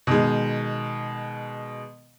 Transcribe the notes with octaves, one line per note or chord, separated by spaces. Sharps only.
B2 D#3 G#3